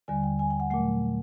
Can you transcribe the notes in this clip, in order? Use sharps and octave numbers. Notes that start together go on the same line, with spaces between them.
D#2 D3 G3 G#5
G5
G#5
G5
F#5
A#2 F#3 A3 F#5